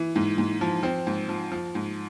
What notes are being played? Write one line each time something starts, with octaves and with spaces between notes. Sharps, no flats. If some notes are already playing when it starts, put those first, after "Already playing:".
Already playing: E3
G#2
G#2
F3
F3 C4
G#2
F3
F3
G#2